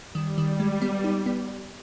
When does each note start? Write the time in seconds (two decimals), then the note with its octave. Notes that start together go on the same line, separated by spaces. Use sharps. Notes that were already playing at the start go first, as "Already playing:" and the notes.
0.15 D#3 G3
0.38 D#3
0.60 G#3
0.82 B3
1.04 D#4
1.26 B3